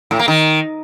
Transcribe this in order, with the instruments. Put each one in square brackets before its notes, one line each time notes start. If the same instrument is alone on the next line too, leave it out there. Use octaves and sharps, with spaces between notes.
[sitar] A2
A#3
D#3